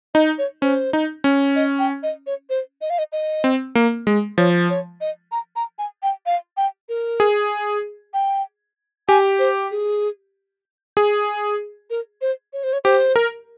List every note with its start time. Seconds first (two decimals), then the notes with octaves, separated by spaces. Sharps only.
0.15 D#4 D#5
0.38 C#5
0.62 C#4 C5
0.93 D#4
1.24 C#4
1.56 D#5
1.79 G5
2.03 D#5
2.27 C#5
2.50 C5
2.81 D#5
2.90 F5
2.99 D#5
3.12 D#5
3.44 C4
3.75 A#3
4.07 G#3
4.38 F3 C#5
4.70 C#5
5.01 D#5
5.32 A#5
5.56 A#5
5.79 G#5
6.03 G5
6.26 F5
6.57 G5
6.89 A#4
7.20 G#4
8.14 G5
9.08 G4 G#5
9.39 C5
9.71 G#4
10.97 G#4
11.90 A#4
12.21 C5
12.53 C#5
12.64 C5
12.73 C#5
12.84 G4 C5
13.16 A#4